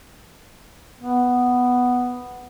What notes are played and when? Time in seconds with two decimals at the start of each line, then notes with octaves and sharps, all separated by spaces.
1.00 B3